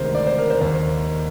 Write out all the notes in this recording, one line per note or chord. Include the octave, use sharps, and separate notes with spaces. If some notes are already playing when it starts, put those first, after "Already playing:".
Already playing: D2 C3 D#3 G#3 A#4 C5
D5
C5
A#4
C5
D#2 D#3 A#3 C5